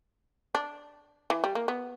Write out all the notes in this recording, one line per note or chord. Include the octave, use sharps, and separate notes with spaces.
D4
E3
G3
A#3
B3